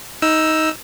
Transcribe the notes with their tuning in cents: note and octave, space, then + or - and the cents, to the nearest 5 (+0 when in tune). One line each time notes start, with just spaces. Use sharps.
D#4 +15 E6 +0